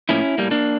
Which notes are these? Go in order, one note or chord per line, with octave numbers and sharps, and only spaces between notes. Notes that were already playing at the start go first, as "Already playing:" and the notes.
A2 F3 A#3 C#4 E4
A2 G3 A#3
A#3 D4